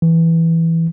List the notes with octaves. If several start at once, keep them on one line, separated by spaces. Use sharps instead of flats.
E3